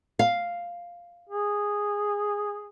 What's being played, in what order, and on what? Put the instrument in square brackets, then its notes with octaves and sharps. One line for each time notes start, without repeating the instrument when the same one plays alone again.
[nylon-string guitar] F5
[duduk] G#4